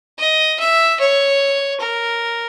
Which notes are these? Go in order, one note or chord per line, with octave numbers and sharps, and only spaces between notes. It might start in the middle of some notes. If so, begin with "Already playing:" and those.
D#5
E5
C#5
A#4